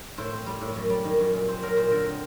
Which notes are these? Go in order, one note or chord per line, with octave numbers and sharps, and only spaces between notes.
A2 C5
C4
G3
A2
F#2
G3
D#3
F#2
A#2
C4 C5
F#3 A#4
A#2 C5
D3 A#4
C4